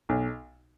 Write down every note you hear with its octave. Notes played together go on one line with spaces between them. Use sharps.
B1